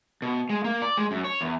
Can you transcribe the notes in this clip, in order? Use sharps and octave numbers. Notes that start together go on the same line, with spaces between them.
B2
G#3
A#3
D5
G#3
F#2
C#5
E2